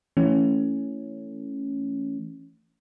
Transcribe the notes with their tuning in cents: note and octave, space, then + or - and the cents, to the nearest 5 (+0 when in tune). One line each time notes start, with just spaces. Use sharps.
E3 +0 A3 +15 C#4 +0